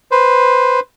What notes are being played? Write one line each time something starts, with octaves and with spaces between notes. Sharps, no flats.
B4 C5